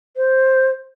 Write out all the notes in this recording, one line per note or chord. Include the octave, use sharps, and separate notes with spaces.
C5